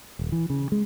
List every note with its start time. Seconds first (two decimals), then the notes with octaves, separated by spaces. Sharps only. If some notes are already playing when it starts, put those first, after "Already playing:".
0.19 D#1
0.32 E3
0.50 C#3
0.72 G#3